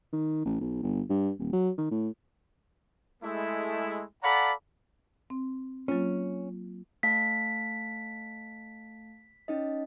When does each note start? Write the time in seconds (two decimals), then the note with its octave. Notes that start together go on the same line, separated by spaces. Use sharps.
0.13 D#3
0.45 A1
0.61 B1
0.83 G1
1.10 G2
1.39 D#1
1.53 F#3
1.78 D#3
1.91 A2
3.23 G#3 A3 E4
4.23 A4 D5 F5 F#5 A#5 B5
5.30 C4
5.88 F#3 A#3 C#4 F4
7.03 A3 F5 A5 B6
9.48 C#4 D#4 D#5